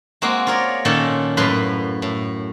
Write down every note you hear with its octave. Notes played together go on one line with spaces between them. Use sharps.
G#3 A#3 C4 F#4
F4 G#4 A#4 C#5 D5
A#2 D#3 C#4 A4 A5
F#2 A2 B4 F5 C6
A2